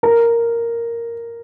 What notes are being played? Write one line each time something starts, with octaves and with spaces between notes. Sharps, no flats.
A#4